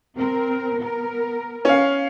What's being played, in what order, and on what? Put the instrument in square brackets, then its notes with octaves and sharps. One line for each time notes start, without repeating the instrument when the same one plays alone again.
[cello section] C4 A#4
B3 A#4
[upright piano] C#4 F5